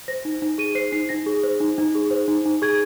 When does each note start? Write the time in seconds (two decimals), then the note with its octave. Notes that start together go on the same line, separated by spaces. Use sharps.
0.08 C5 A#6
0.25 D#4
0.42 D#4
0.58 G#4 D#7
0.75 C5 C7
0.92 D#4 C7
1.09 D#4 A#6
1.26 G#4
1.43 C5
1.60 D#4
1.78 D#4
1.95 G#4
2.11 C5
2.28 D#4
2.46 D#4
2.62 G#4 G#6